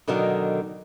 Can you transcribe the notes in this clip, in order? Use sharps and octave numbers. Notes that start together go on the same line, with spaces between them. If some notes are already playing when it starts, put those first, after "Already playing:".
B2 D3 D#3 F#3